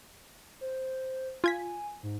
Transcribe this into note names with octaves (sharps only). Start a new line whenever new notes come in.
C5
F4 G#5 G#6 B6
G#2